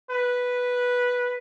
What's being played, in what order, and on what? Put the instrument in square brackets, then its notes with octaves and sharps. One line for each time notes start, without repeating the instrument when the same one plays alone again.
[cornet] B4